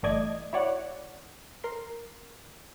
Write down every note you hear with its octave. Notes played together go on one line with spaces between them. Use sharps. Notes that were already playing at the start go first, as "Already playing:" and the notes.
G1 E3 A3 D5 D#5 G#6
E4 F#4 C#5 D5 F#5
A#4 C6